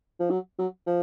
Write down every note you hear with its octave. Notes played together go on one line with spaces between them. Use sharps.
F3
F#3
F#3
F3